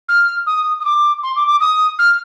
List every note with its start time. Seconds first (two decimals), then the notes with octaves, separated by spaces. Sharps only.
0.09 F6
0.46 D#6
0.80 D#6
0.85 D6
1.23 C6
1.36 D6
1.47 D6
1.60 D#6
1.99 F6